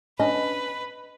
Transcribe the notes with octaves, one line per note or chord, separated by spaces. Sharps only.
C#4 D4 B4 D#5